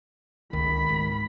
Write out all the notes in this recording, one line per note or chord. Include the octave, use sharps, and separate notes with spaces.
C#2 D#3 B5
G#2